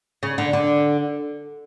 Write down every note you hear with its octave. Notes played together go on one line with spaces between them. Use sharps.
C#3
D3
D3